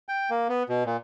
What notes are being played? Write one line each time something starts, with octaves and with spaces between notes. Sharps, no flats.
G5
A#3
B3
B2
A#2